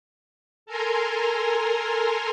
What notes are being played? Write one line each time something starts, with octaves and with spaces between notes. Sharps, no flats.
A4 A#4 G#5 A#5 C6